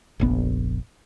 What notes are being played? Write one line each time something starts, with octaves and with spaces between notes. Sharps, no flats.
F1 A#1 B3